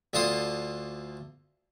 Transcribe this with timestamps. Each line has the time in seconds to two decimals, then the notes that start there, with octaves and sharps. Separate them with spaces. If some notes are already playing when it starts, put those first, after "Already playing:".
0.13 D2 D3 F4 A5 C6 D#6